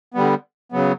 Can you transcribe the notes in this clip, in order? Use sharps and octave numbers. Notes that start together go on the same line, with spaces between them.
D3 G3 B3
C#3 F#3 B3